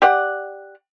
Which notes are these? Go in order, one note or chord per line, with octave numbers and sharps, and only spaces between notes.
G4 D5 F#5